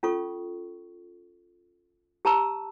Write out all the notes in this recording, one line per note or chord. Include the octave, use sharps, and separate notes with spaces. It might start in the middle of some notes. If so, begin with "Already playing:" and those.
C#4 F4 A4 C#6
G4 A5 A#5 E6